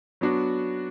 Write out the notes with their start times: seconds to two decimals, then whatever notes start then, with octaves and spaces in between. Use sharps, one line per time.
0.21 F#3 B3 D4 F#4